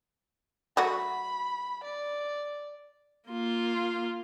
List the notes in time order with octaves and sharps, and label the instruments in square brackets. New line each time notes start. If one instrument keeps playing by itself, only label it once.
[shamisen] F#3 A3 F#4 [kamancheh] B5
[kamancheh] D5
[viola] A#3 F4